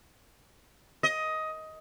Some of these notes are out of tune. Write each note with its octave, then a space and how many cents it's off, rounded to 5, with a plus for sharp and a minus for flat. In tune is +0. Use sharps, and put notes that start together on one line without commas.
D#5 +15